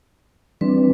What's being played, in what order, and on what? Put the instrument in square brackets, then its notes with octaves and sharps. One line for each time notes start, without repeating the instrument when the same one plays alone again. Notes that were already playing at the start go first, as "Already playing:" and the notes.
[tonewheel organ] E3 G3 D4 [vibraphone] C4 B4